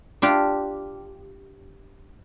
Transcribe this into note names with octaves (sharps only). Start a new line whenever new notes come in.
D4 F4 G4